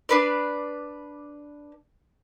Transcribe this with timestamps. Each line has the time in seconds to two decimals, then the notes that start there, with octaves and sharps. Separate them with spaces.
0.09 D4 B4 D5